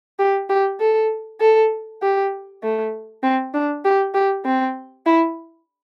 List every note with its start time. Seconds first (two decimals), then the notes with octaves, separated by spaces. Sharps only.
0.19 G4
0.49 G4
0.80 A4
1.41 A4
2.02 G4
2.63 A3
3.23 C4
3.54 D4
3.85 G4
4.14 G4
4.45 C4
5.06 E4